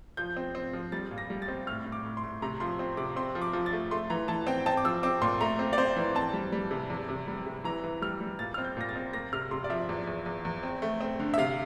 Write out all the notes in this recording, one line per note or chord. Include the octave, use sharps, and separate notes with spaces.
F3 G6
C4
C4
F3
G3 A6
A#2
A#6
G3
A6
C4
A2 F6
A2
D6
A2
C6
A2
C3 A#5
F3 C6
C4
C3 D6
C4 C6
F3
D6
F3
A6
A3
A3 C6
E3 A#5
E3 A5
C4 G5
C4 A5
D6
F3 E6
C4 D6
A#2 C6
A3 A#5
C4
D5
C4 C5
E3
C4 A5
G3
G3
C3
E2
C3
G3
C3
E3 A#5
E3
G3 F6
G3
A#2 A6
C4 F6
G6
A#2 A#6
A6
C4
A#3 A#6
C3 F6
C3 C6
D5
F3 E5
E2
E2
E2
E2
C4
A3
C4
D3
E5
C3 F5